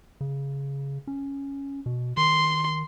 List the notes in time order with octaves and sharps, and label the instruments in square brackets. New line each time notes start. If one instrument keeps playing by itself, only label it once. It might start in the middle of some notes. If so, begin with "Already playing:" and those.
[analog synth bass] C#3
C#4
B2
[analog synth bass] D#3 [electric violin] C6